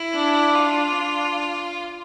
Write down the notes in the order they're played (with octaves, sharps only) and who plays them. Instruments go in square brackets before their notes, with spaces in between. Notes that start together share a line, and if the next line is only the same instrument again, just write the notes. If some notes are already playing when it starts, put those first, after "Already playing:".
Already playing: [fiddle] E4
[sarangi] D4
[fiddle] F4
[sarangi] D4